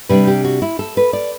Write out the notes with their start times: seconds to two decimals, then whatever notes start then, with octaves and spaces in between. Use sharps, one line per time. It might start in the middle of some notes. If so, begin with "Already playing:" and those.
0.09 C3 G3 D4 B4
0.27 G4
0.44 F#4
0.62 E4
0.79 A4
0.97 B4
1.13 D5